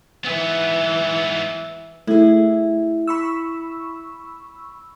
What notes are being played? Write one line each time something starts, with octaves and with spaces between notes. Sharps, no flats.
G#2 E3 B3
A3 E4 G#4
B5 C#6 E6